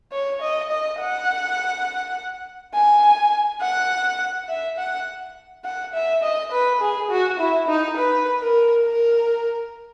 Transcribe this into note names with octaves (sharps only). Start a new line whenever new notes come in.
C#5
D#5
D#5
F#5
G#5
F#5
E5
F#5
F#5
E5
D#5
B4
G#4
F#4
E4
D#4
B4
A#4
A#4